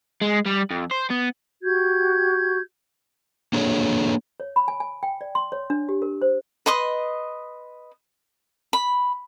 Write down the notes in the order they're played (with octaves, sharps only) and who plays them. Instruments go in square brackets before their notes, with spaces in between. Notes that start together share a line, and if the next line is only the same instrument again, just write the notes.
[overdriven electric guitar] G#3
G3
F2
C5
B3
[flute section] F#4 G4 G6 G#6
[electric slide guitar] A#3 D4 G#4 A4 C#5
[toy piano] C#5
B5
G#5
G#5
G5
D5
C6
C#5
D4
G4
A#4
C5
[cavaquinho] B4 D#5 C6 D#6
B5